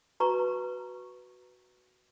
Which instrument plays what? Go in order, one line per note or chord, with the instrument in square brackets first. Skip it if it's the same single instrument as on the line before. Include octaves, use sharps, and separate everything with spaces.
[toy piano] F#4 B4 A#5 C#6